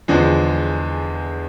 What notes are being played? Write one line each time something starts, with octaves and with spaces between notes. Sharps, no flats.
E2 D3 F3 G#3